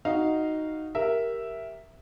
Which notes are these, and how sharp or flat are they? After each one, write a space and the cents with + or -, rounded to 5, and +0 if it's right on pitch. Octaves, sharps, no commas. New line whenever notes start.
D#4 +0 F#4 +0 F5 -5
G4 +0 A#4 +0 E5 +0